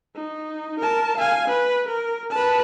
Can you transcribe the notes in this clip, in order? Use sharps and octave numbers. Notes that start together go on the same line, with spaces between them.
D#4
A#4 A5
F5 G#5
B4
A#4
B4 A5